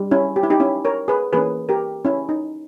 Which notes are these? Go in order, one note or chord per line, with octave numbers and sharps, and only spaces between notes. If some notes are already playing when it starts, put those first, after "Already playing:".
Already playing: G3
C#4 E4
G4
E4
D#4 G4
C#4 E4
A#4 C#5
G#4 B4
E3 A#3 C#4 G#4 B4
G4 A#4
C#4 E4
D#4